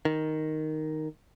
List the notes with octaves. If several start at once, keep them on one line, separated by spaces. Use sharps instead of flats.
D#3